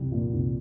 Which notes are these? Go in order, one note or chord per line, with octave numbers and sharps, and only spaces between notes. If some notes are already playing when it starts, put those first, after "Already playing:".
Already playing: C2 G3
A#2
C2